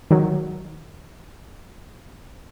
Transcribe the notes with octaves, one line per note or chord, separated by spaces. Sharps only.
D#3 F#3